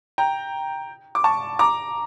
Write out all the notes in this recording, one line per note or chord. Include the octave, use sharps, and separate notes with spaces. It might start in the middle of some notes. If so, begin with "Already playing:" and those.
G5 A#5
D6
A5 C#6
A#5 D6